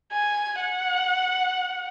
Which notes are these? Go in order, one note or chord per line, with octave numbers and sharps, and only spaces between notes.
G#5
F#5